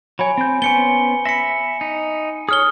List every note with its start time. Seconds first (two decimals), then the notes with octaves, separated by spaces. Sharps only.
0.19 F#3 C#5 G#5 B5
0.38 C4 G6
0.62 B3 C#4 C5 G#5 C#7 G7
1.25 E5 B5 A#6 C#7
1.81 D#4
2.49 G#4 C#5 D#6 F6 G7